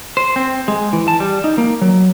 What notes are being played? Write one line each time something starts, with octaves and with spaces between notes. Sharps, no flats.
C5
C4
G#3
E3
A5
G3
D#4
A#3
F#3